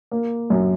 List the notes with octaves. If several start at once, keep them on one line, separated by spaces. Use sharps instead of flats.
A#3
F#2